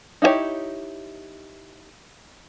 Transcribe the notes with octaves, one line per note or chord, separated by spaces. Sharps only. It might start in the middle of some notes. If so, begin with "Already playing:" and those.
D#4 E4 F#4 G4 C#5